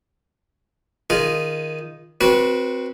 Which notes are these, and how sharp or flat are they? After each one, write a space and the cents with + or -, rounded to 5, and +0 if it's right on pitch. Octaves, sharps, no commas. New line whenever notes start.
D#3 +0 F4 -10 G#4 -10
C4 +0 F#4 +0 B4 -30